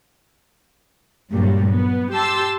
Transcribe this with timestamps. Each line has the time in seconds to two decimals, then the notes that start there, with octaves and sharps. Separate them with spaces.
1.32 G2 A#2 F#3 G3
1.69 B3
2.14 G4 A5 C6 E6